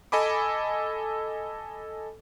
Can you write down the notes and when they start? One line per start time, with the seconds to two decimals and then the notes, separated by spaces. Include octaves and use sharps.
0.12 A4 D#5 G#5 B5 D6